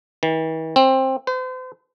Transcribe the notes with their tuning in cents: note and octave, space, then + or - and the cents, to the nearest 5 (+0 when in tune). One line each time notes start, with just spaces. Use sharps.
E3 -45
C4 +15
C5 -40